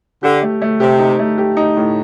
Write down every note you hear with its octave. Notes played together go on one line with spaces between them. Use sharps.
D3 G4
A3
A3
C3 G4
D#4
A3
G4
D#4
A2